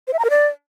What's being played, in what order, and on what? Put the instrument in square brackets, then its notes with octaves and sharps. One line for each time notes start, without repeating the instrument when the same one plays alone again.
[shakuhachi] C5
E5
A#5
A#4
D5